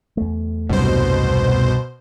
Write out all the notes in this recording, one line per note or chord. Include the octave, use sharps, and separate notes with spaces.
E2 A3
C2 G2 B2 F#3 C5